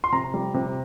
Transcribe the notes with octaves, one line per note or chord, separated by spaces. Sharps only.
C6
C3 A#5
G3
C3